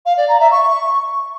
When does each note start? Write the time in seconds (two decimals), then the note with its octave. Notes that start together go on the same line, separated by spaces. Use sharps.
0.06 F5
0.17 D5
0.28 A#5
0.40 E5
0.51 C#6